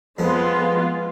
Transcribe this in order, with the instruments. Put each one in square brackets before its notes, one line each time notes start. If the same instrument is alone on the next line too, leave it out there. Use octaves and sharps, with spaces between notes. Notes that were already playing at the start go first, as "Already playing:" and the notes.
[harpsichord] F2 F3 [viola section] G#3 B3 F4